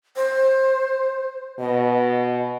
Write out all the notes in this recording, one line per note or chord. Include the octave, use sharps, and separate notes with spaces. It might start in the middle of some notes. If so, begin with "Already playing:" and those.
C5
B2 D#5